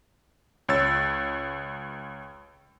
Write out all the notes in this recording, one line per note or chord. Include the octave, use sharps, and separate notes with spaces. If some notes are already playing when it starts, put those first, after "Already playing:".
C#2 C#5 E6 A6